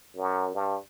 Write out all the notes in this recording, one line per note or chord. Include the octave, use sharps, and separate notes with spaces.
F#2
G2